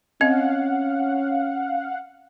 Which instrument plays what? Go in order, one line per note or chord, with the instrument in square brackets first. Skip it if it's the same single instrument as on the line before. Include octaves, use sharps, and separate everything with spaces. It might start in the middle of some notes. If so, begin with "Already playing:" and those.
[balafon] C4 D#5 [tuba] C#4 [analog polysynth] F5 F#5